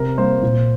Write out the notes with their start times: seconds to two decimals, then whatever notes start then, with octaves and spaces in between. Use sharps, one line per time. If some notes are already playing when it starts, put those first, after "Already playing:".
Already playing: C3 A#4
0.18 G3 A#3 C5
0.43 A#2